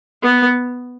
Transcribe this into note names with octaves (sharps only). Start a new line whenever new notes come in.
B3